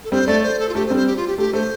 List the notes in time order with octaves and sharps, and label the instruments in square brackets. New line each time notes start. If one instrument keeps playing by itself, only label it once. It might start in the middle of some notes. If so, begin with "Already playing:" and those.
[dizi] A4
[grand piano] G3 C4 [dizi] C5
[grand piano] A3 [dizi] D5
[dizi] C5
A4
F4
[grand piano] A3 [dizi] G4
[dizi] C5
[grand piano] G3 C4
[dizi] C5
G4
F4
G4
[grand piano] A3 [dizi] G4
[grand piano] A3 [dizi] C5